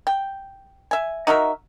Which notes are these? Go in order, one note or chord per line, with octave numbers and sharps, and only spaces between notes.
G5
E5 G#5
D#4 F#4 A#4 E5